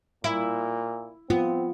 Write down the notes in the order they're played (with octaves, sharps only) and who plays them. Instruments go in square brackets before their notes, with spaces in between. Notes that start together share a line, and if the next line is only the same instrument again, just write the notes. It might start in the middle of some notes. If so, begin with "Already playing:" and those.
[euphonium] A#2 [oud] E4
[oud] B3 [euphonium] C4 [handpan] F4